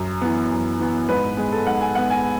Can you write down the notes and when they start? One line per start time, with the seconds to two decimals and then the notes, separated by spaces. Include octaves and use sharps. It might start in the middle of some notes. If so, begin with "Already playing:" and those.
Already playing: F#2
0.21 E3 B3
0.51 F#2
0.79 E3 B3
1.09 G#2 B4
1.37 G#3 B3 G#4
1.52 A4
1.67 G#2 F#5
1.81 G#5
1.95 G#3 B3 F#5
2.10 G#5